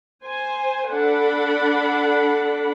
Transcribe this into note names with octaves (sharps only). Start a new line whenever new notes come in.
C5 G#5
D4 A4 F#5 B5